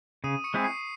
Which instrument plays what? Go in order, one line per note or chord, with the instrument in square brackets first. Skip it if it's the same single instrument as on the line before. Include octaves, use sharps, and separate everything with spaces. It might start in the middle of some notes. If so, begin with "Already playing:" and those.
[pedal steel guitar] C#3 [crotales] D#6 D#7
[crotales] C#6 C#7
[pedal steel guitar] G#3 C4 E4 G#4
[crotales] C7